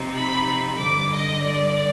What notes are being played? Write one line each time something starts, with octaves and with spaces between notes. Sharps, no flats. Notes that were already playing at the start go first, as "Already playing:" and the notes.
Already playing: C3 F3 C4 D#4
B5
G2 D3 G3 D6
D#5
D5